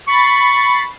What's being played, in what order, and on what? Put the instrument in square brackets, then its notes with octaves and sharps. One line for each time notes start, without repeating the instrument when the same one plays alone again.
[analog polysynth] B5 A6 C7 [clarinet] C#6